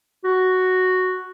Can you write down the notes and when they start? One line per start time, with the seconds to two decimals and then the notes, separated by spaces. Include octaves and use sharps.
0.24 F#4